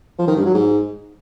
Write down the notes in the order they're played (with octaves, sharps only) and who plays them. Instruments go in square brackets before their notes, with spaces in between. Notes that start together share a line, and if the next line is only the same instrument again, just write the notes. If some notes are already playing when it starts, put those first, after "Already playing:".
[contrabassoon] F3
D#3
G2
F#3
G#2